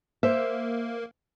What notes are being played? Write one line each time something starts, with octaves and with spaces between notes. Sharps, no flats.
A#3 C5 E5